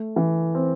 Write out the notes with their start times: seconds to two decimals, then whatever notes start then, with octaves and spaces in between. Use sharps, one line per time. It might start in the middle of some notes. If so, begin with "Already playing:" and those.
Already playing: A3
0.16 E3
0.54 C4